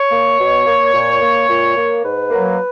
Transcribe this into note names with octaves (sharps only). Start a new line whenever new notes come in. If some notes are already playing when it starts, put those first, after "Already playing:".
Already playing: C#5
A#3
B2
A#3
A#2
A#3
A#2
A#3
G#2 B4
F#3 A#3